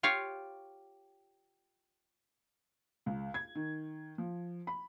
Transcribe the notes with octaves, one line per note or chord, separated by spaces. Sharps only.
F4 G4 C#5 F5
C#2
G#6
D#3
F3
B5